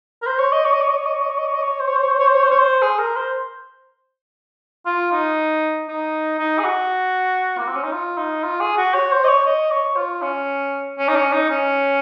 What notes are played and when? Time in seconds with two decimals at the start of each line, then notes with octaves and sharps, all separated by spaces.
0.22 A#4
0.27 C5
0.39 C#5
0.52 D#5
0.65 C#5
0.73 D#5
0.81 C#5
0.90 D#5
0.97 C#5
1.06 D#5
1.14 C#5
1.22 D#5
1.30 C#5
1.38 D#5
1.46 C#5
1.54 D#5
1.63 C#5
1.80 C5
1.88 C#5
1.96 C5
2.03 C#5
2.12 C5
2.19 C#5
2.27 C5
2.35 C#5
2.43 C5
2.51 C#5
2.59 C5
2.82 G#4
2.99 A#4
3.16 C5
4.86 F4
5.12 D#4
5.88 D#4
6.39 D#4
6.59 G#4
6.64 F#4
7.59 A#3
7.67 C4
7.76 C#4
7.84 D#4
7.93 F4
8.18 D#4
8.43 F4
8.61 G#4
8.78 F#4
8.94 C#5
9.12 C5
9.24 D#5
9.28 C#5
9.46 D#5
9.71 C#5
9.96 F4
10.22 C#4
10.99 C#4
11.09 D#4
11.16 C#4
11.33 D#4
11.50 C#4